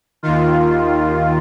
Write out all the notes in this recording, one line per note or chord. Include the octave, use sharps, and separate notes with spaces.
D#2 D#3 F4